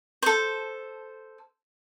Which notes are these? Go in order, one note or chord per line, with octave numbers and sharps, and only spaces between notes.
A4 C5